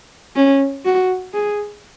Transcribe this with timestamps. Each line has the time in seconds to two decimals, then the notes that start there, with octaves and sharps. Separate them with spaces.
0.36 C#4
0.85 F#4
1.33 G#4